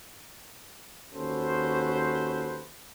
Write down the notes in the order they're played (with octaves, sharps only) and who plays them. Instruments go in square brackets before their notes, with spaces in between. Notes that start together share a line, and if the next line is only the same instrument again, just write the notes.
[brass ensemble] D#2 C#4 F#4 A4 B4 C5